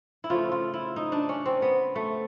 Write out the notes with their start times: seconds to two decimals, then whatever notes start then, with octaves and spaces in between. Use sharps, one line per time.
0.24 E4
0.30 C#3 F3 A3 F4
0.52 F4
0.74 E4
0.96 D#4
1.12 D4
1.29 C#4
1.46 C4
1.62 B3
1.95 A3